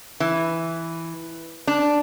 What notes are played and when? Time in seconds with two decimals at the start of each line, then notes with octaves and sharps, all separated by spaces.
0.20 E3
1.67 D4